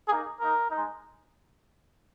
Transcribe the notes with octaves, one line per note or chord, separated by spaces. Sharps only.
A#3 D#4 G#4
A#3 D#4 A#4
G#3 D#4